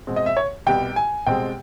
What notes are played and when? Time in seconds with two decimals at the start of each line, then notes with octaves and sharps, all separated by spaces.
0.07 B2 G#3 C4
0.16 D#5
0.26 E5
0.37 C#5
0.67 C2 B2 G3 B3 G5
0.96 G#5
1.27 C2 B2 G#3 C4 G5